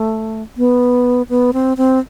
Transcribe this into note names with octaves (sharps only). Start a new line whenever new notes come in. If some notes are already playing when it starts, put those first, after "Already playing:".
Already playing: A3
B3
B3
C4
C4